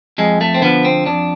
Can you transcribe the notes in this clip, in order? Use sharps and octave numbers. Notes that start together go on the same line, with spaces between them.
F2 G#3
A3
C4
D3 F3 B3
C4
F2 D4